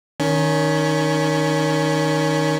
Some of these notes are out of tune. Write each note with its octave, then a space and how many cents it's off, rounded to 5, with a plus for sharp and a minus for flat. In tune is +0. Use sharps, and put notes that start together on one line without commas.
D#3 +0 C#4 +20